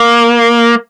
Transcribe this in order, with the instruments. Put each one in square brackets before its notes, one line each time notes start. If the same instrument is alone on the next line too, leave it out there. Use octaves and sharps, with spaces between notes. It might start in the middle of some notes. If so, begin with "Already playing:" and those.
Already playing: [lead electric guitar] A#3